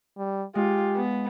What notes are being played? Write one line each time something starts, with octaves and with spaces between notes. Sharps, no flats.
G3
G#3 F4 G4
B3